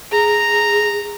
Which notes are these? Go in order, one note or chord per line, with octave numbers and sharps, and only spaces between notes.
G#4 A#5